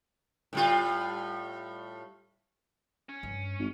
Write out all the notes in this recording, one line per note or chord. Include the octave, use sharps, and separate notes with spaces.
A2 G3 F4
C#4
G2
G#1